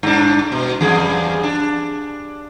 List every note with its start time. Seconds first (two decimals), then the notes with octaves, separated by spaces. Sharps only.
0.03 G2 D4
0.52 B2
0.81 E2 G2 G#4
1.43 D4